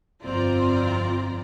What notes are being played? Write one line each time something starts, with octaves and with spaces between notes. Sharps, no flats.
G1 F2 C4 F4 D5 A#5